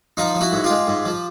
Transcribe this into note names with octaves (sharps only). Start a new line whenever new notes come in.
F3 D#4 F4
F3
E4 F#4
G#2
F4 G4
G#3
G#2
F3